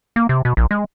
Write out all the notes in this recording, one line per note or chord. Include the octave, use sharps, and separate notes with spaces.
A#3
C3
B2
A#1
G#3